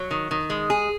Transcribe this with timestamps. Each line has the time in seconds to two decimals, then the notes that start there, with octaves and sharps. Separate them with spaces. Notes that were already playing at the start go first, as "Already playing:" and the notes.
Already playing: F#3
0.11 D#3
0.31 D#3
0.50 G#3
0.70 G#4